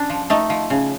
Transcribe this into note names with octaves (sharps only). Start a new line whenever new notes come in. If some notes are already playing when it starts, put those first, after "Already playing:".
Already playing: C#4 D4
F3
A3 D#4
F3
C#3